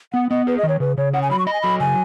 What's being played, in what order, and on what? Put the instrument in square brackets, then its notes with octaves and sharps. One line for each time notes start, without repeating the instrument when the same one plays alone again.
[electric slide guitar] B3 [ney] F#5
[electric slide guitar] B3 [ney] D#5
[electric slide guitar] G#4 [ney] B4
[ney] D#5
[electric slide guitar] D#3
[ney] C#5
[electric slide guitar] C#3 [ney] B4
[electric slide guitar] C#3 [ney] C#5
[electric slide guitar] C#5 [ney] F#5
[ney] G#5
[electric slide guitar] F#3 [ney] B5
[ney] C#6
[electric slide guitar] D#5 [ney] B5
[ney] G#5
[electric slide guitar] F#3 [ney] B5
[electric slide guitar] C#3 [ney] G#5